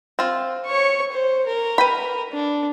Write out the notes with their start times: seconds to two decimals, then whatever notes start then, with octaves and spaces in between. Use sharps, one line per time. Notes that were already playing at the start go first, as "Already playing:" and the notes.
0.19 C4 F4
0.66 C#5 C#6
1.12 C5
1.46 A#4
1.78 B4 G5 B5
2.33 D4